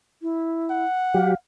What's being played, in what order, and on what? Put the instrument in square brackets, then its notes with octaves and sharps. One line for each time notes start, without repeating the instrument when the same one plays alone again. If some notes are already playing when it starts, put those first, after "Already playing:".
[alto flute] E4
[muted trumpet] F#5
[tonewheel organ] F#3 G4 [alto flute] F5